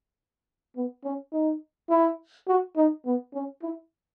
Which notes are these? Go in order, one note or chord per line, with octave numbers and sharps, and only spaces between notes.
B3
C#4
D#4
E4
F#4
D#4
B3
C#4
E4